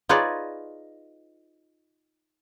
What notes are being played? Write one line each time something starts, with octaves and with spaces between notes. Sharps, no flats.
D#4 F4 G#4 B4 C#5 D5